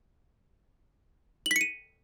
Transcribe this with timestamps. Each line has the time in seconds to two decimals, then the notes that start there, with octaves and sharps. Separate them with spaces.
1.46 F#7
1.51 B6
1.56 C#7
1.61 D#7